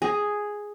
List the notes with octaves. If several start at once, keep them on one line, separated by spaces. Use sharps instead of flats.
G#4